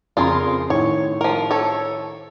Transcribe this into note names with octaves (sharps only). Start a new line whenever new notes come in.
F2 C#3 F4 G#4 A#4 C6
A2 D#3 C#5
F3 A#4
A4 C#5